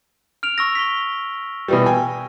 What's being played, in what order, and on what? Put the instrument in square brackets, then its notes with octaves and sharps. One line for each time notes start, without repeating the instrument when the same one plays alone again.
[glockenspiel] F6 D7 F7
C#6 E6 A#6
B6 G7
[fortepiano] B2 E3 G3
G5 G#5